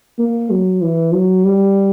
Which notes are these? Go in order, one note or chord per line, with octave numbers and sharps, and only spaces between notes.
A#3
F#3
E3
F#3
G3